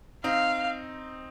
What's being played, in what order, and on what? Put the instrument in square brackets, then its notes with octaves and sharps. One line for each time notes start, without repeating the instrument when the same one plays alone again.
[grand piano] C4 D#4 [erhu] F5